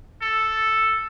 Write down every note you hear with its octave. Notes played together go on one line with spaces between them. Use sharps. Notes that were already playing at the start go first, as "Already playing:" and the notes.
A4